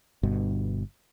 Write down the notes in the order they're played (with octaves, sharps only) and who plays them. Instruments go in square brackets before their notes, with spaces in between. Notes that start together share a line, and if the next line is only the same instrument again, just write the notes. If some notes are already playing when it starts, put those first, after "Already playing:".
[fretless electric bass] G1 G2 B2